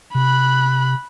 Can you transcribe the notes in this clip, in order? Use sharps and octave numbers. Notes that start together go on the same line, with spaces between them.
C3 B5 F#6